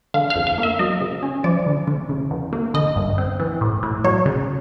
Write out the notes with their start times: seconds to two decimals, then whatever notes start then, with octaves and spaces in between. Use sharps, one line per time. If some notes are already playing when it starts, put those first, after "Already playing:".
0.14 D3 F5
0.30 F5
0.36 F2
0.47 F5
0.58 A#3
0.63 E5
0.79 F#3 D#5
1.01 C#3
1.23 C#4
1.44 F3 D5
1.66 D3
1.88 D3
2.09 C#3
2.31 E2
2.53 A#3
2.74 D3 D#5
2.96 G2
3.18 C4
3.40 E3
3.61 A2
3.83 A2
4.04 F#3 C#5
4.26 C#3